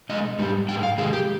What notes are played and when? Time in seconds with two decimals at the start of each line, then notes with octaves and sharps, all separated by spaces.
0.09 B2 G#3 D#5
0.38 G#2 G3
0.68 G#2 G3 G5
0.83 F5
0.98 C3 D#3 G#3 G#4
1.13 G4